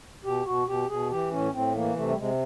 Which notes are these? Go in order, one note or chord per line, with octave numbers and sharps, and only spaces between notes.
B2 G4
B2 F#4
B2 G4
B2 G#4
E3 G4
A2 C#4
A2 C4
E3 A#3
C3 A3
G3
C3 G#3